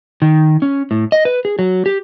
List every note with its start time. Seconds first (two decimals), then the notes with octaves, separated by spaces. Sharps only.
0.22 D#3
0.62 C#4
0.91 A2
1.12 D#5
1.25 B4
1.45 G#4
1.59 F#3
1.86 G4